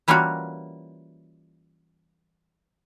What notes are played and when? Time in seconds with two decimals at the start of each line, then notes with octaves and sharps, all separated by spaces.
0.08 E3 G3 A#3 C#4 F4 F#4